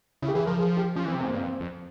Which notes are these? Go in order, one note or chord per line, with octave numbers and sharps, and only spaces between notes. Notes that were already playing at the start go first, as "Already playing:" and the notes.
C#3 E4
G4
E3 G#4
F3 A#4
G#4
G4
F3 C#4
E3
C4
C3
G#2 C4
A#3
G2
F2 C4
F2